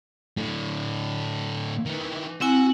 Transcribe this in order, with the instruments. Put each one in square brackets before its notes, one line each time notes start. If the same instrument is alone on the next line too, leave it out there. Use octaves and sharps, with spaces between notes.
[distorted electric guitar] A2 D3
D#3 E3
[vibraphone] C4 E4 G#5 [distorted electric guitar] F#4